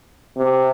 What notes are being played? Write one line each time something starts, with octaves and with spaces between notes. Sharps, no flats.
C3